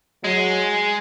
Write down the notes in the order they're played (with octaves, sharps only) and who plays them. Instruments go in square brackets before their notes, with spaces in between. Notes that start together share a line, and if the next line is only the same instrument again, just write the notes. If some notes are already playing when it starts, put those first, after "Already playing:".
[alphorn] F#3 [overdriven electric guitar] G#3